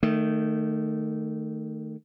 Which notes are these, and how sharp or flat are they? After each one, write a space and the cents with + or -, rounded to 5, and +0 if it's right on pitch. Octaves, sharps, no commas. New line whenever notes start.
D#3 -10 A3 +15